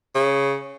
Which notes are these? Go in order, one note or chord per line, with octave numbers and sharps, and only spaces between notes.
C#3